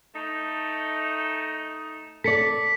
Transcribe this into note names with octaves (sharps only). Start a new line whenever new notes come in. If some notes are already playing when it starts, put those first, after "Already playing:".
A3 D#4
A4 D5 B6 C#7